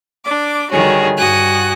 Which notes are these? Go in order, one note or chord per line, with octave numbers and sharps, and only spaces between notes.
D4 D6
D3 D#3 G3 F#4 G#4 C#5
G2 F#4 G#5 D#6 F#6